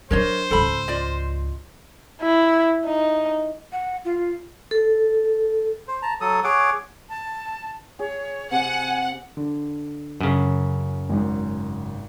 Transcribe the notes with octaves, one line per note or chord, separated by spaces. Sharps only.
F#3 D4 A#4 C5 C#5 D#5
C#2 G#2 A4 B5
F4 D5 D#5
E4
D#4
F#5
F4
A4
C5
A5 A#5
F#3 A4 D#6
G#4 C#5 F#5 D6
A5
G#4 C#5
C3 F#5 G#5
D3
F#2 C#3
G#1 G#2